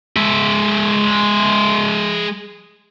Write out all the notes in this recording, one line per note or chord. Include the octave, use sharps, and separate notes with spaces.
G#3 E5